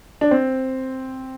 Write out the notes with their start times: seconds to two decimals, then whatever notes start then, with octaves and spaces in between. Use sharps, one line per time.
0.21 D4
0.31 C4